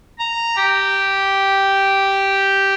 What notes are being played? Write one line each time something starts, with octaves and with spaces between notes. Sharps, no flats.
A#5
G4